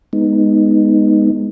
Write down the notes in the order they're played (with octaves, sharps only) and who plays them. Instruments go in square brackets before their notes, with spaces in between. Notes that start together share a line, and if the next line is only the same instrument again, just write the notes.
[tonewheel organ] G#3 B3 D#4